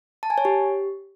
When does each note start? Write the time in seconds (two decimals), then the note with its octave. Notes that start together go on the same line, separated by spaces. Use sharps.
0.23 A5
0.30 G#5
0.38 C#5
0.45 G4